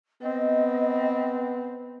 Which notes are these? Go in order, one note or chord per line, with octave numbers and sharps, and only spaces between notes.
B3 C4 D#5